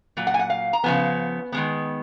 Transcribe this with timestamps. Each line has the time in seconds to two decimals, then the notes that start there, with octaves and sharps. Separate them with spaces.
0.17 A#2 F#3
0.27 F#5
0.34 G#5
0.39 F#5
0.50 F5
0.73 A#5
0.84 C#3 F3 B3 G#5
1.52 D#3 G#3 B3